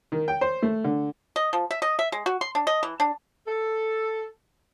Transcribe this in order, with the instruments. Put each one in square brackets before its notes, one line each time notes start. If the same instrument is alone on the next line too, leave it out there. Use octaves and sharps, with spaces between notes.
[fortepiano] D#3
G5
C5
A3
D3
[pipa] D#5
F3
E5
D#5
E5
G#3
F#4
C6
D4
D#5
E3
D4
[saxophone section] A4